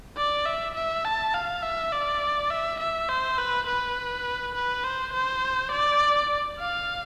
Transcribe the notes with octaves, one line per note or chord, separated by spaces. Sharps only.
D5
E5
E5
A5
F5
E5
D5
E5
E5
C5
B4
B4
B4
C5
C5
D5
F5